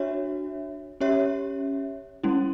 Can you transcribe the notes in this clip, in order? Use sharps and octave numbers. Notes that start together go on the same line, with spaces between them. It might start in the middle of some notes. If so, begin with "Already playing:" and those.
Already playing: D4 F#4 C#5 E5
C#4 G4 C#5 E5
G3 C#4 E4